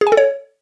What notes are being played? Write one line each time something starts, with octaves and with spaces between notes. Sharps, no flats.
G#4
G#5
A4
C#5